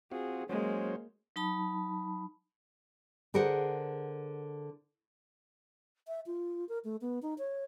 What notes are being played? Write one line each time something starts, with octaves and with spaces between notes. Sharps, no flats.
C4 F4 F#4 G#4
F#3 G#3 A#3 C#4 C5
F#3 D#4 A5 B5
D3 G#4 A#4 C5 F#5
E5
F4
A#4
A3
B3
D#4
C#5